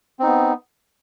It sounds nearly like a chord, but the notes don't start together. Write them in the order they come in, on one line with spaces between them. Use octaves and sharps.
C4 D#4 B3